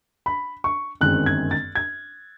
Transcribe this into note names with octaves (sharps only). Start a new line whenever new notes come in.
B5
C#6
G1 F#2 D#3 G#3 C4 F#6
G#6
A6
G#6